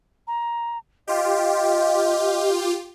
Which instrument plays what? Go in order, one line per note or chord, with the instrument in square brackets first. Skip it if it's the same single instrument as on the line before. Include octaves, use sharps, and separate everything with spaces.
[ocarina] A#5
[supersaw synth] F4 G4 [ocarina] D#5